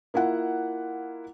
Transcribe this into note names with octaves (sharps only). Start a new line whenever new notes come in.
A#3 E4 F4 F#5